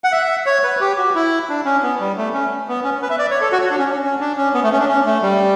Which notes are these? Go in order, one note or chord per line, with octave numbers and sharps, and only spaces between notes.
F#5
E5
C#5
B4
G4
F#4
E4
D4
C#4
B3
G3
A3
C#4
B3
C#4
B4
E5
D5
C#5
A4
F#4
C#5
D4
C#4
C#4
D4
C#4
B3
A3
C#4
D4
C#4
A3
G3